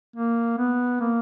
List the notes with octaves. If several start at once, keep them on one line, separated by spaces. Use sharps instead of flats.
A#3
B3
A#3